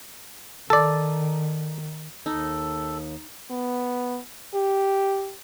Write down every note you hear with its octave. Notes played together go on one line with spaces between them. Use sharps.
D#3 A4 D5
D#2 D#4 A4
B3
G4